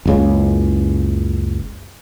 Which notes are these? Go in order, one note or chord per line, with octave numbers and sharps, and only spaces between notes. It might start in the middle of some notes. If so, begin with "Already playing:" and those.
F#1 C#2 C#3